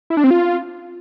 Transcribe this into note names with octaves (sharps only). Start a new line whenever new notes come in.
E4
D4
C4
F4